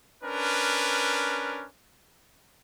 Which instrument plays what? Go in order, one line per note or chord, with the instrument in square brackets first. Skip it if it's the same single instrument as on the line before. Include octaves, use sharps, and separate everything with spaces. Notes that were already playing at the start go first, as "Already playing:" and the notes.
[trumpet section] C#4 D4 A#4 B4